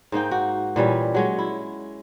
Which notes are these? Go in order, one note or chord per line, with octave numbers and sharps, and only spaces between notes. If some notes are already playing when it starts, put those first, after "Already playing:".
G#2 A#3 D#4 G5
F#4
A#2 E3 G3 C#4
F#3 G#3 C#5
E4